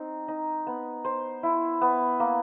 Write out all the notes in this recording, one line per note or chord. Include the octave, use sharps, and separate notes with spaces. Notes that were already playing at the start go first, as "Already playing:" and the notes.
Already playing: C4 D#4
D#4
B3
C5
E4
B3
A#3